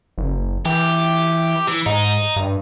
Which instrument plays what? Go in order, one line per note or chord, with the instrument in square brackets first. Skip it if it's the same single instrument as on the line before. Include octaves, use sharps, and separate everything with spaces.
[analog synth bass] F#1
[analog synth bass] E3 [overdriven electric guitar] G4
[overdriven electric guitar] E3
[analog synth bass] G#2 [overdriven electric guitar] D#4
[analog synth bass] G2